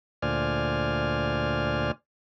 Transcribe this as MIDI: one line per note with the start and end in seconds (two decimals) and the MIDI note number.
0.22 1.91 38
0.22 1.91 46
0.22 1.91 72
0.22 1.91 74
0.22 1.91 80
0.22 1.91 89